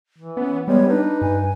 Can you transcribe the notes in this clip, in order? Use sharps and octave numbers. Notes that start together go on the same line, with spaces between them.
E3
B3 C#4
G3 G#3 B3 C#5
D4 D#4 B4
G2 G#5